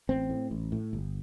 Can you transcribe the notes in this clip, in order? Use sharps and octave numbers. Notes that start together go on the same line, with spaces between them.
A1 C4
A2
A1
A2
G1